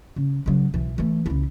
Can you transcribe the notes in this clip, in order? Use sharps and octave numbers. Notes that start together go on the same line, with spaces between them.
C#3
C#3 F#3
B1 E3
E3 A3
C#2 E4